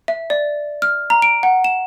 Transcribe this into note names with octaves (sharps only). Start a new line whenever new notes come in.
E5
D5
F6
A#5
D7
F#5
E7